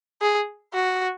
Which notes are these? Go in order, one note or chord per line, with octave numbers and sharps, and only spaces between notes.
G#4
F#4